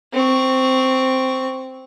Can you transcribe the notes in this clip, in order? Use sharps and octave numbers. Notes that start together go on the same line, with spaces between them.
C4 C#6